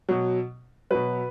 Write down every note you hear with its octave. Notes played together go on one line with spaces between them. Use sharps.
B2 F#3
B2 F#3 B4